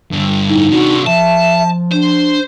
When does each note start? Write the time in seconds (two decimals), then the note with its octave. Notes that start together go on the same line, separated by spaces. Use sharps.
0.11 G2 D3
0.49 A2 D#4
0.71 C3 D4 F#4
1.06 F3 E5 A5
1.92 D4 C5